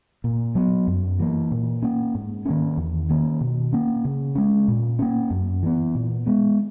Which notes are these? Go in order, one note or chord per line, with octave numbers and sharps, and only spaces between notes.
A#2
F#3 B3
F#2
E3 A#3
A#2
A#3 C#4
G#2
D#3 A#3 C#4
E2
D#3 A#3 C#4
B2
A#3 C#4
C#3
G#3 C#4
A#2
A#3 C#4
F#2
E3 B3
A#2
G#3 B3